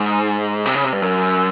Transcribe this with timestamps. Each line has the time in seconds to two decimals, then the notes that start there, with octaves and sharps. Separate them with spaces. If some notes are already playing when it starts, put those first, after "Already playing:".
Already playing: G#2
0.66 C3
0.74 C#3
0.84 C3
0.93 G2
1.02 F#2